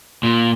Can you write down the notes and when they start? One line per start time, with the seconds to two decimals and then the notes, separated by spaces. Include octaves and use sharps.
0.23 A#2